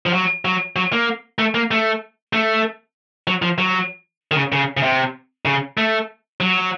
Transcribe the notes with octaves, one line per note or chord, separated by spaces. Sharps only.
F3
F#3
F#3
F#3
A#3
A3
A#3
A3
A3
F#3
F3
F#3
D#3
C#3
C#3
C#3
C3
C#3
A3
F#3